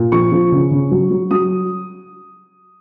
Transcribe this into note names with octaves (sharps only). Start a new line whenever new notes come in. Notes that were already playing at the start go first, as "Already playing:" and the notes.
Already playing: A#2
F3 C#6
F3
C#3
C#3
F#3
F#3
F#3 D#6